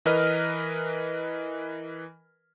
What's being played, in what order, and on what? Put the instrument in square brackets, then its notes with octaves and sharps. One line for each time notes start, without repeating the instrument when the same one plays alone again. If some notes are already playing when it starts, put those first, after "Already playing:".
[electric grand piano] E3 A#4 B4 D#5 F6